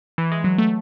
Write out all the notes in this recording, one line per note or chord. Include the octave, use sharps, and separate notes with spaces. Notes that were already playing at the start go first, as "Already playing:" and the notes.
E3
G#3
F#3
A3